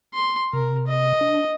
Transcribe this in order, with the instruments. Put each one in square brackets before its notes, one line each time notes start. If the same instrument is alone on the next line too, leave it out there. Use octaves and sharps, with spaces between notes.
[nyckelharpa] C6
[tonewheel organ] C3 [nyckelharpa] A#4
[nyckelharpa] D#5
[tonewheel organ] D4